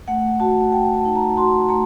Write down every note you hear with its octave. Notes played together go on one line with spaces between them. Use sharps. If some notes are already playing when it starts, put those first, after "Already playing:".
A3 F#5
F#4 A5
A3 G5
A5
D#4
A#5
F#4 C6
A3 A#5